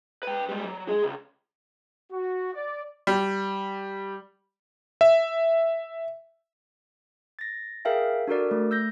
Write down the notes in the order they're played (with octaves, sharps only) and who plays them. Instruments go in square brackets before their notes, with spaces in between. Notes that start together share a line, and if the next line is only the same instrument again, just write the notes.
[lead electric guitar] B4 G5
G3 G#3
F#3
G#3 G#4
C#2
[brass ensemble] F#4
D5
[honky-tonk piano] G3
[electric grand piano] E5
[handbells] A6 A#6
G#4 A#4 E5 F5 G5
D4 F#4 A4 A#4 D5
A3
E6 G6 A#6